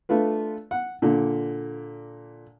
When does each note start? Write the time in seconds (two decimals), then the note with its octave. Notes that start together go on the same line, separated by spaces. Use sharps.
0.09 A3 D4 F4 B4
0.71 F#5
1.02 A#2 D3